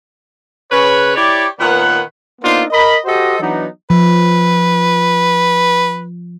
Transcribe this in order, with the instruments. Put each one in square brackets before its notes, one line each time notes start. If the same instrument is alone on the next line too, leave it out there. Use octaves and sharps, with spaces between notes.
[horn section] C#3 B4 C#5
E4 G4 C#5 D5
A#2 D#3 B3 B4 C#5 F#5
A#3 B3 D4 D#4 F4 C5
A#4 D#5 B5
F#4 G4 A4 C5 D#5
E3 F#3 B3 D4 D#4
[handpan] F3 [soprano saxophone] B4